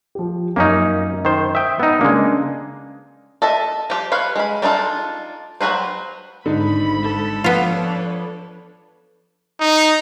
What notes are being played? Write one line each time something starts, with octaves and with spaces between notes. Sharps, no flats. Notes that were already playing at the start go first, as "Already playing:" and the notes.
F3 G4
F#2 A#3 C#4 D#4
D#3 C5
E5 G5 D#6
B3 D#4 E6
C#3 G#3 A#3 D4
A4 D#5 E5
F3 G4
B4 C#5 F5
G#3 B5
G3 D4 D#4 F4 A4
F#3 C4 F#4 B4 C5
G#1 G#2 D3 D#4 B5
A4
F3 B3 D4 F4 B4 C#5
D#4